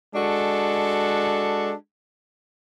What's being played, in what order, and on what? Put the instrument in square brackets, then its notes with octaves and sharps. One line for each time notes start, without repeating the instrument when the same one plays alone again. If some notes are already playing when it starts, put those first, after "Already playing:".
[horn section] G#3 D4 F#4 A4